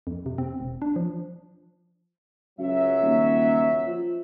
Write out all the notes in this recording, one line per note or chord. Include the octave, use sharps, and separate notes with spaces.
F2
C3
C4
E1
D4
F3
C#2 F#2 F#3 E5
D#1
F3